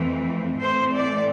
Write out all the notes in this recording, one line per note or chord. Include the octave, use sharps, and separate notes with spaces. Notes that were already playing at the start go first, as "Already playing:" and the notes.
Already playing: F2 E3 A3 C4
A2 E3 A3 C4 C5
D5